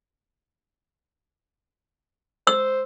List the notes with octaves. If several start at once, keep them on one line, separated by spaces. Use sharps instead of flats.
C5 E6